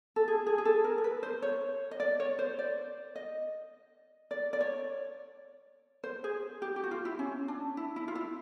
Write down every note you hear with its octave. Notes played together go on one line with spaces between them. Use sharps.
A4
G#4
G#4
G#4
A4
A#4
A#4
B4
C5
C#5
D#5
D5
C#5
C5
D5
D#5
D5
D5
C#5
C5
G#4
G4
G4
F#4
F4
E4
C#4
D4
E4
E4
F4
E4